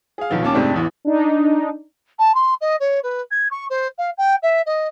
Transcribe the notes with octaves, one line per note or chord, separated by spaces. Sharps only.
G#4 F5
B1 D#3 F3 B3
D#2 A#3 C#4 A5 D6
F2 G#2 C3 A3 D4
A1 E2 E3
D4 D#4
A5
C6
D#5
C#5
B4
G#6
C#6
C5
F5
G5
E5
D#5